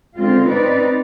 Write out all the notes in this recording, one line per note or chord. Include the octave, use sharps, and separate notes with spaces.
D3 G#3 C4 F4
C4 D#4 B4 D5